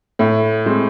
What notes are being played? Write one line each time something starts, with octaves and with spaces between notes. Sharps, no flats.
A2
G#3 C4